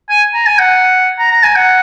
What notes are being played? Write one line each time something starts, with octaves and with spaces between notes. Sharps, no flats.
G#5
A#5
G#5
F#5
A#5
A#5
G#5
F#5